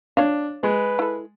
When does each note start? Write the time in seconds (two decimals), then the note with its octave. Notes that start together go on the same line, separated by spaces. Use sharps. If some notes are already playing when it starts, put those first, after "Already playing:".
0.17 D4 C#5 F5
0.63 G#3 B4
0.99 E4 A4